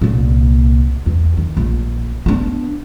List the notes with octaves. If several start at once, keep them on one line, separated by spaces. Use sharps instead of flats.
C2 A#2
E2
D#3
A#1
B3 D4